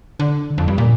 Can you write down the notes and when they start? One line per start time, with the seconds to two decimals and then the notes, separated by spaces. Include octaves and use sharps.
0.20 D3
0.58 F2
0.68 G2
0.78 A#2